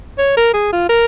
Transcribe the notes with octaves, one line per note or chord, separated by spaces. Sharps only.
C#5
A#4
G#4
F4
A#4